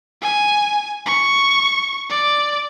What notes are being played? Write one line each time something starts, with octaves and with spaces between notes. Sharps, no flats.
G#5
C#6
D5